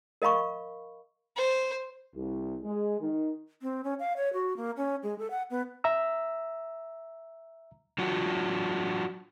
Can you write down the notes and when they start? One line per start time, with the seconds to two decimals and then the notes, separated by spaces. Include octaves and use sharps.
0.22 A#4 D#5 F5 B5 C#6
1.37 C5
2.15 C2
2.63 G#3
3.01 D#3
3.62 C4
3.84 C#4
4.00 F5
4.17 C#5
4.33 F#4
4.57 A#3
4.77 C#4
5.03 G#3
5.19 A4
5.31 F#5
5.50 B3
5.84 E5 A#5 E6
7.98 F#3 D4 F4 F#4